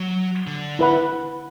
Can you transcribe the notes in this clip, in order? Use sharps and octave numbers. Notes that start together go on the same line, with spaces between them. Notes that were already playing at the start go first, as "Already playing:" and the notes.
Already playing: F#3
D3
E4 B4 F#5 B5